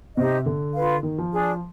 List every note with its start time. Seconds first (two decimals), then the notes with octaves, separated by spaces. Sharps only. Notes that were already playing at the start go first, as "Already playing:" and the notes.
0.17 C3 D#4 G4 C5 D#5
0.46 D3
0.75 F4 B4 F5
1.03 D#3
1.18 F3
1.33 D4 G#4 D5